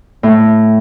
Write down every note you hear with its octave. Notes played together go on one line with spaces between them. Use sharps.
A2